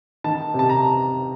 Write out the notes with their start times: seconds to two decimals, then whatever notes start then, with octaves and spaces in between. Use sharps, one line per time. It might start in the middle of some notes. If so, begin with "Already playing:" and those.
0.24 D#3 A5
0.54 C3
0.59 A5
0.69 A#5